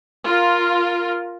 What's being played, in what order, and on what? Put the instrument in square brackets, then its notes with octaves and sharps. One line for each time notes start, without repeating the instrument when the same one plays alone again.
[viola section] F4 A#4